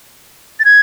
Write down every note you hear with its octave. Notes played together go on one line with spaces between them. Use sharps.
A6
G#6